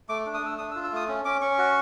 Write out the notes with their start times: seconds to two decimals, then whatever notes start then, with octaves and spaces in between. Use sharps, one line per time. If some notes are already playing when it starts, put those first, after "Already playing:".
0.09 A3 D6
0.26 D4
0.34 D#6
0.42 A3 E6
0.58 D4 D#6
0.71 E6
0.76 F4
0.84 E6
0.91 A3 D#6
1.08 C#4
1.25 C#4 D6
1.41 C#4 C#6
1.58 F#4